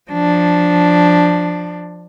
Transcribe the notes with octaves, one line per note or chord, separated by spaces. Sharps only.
F3 D4